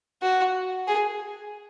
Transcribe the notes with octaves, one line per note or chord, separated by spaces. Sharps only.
F#4
G#4